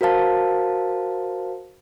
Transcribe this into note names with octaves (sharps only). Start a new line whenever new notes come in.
F#4 A#4 C5 F5 A5